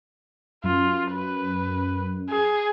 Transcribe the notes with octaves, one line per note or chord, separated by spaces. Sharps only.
F#2 F4
B4
G#4